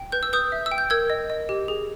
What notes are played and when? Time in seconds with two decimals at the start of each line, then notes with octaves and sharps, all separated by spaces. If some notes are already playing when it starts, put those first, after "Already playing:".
Already playing: G5
0.12 B4 G6
0.23 E6
0.33 B4 D#6 G6
0.52 E5
0.66 E6
0.71 G5
0.78 G6
0.90 A#4 E6 G#6
1.10 D#5
1.30 D#5
1.49 G4
1.68 G#4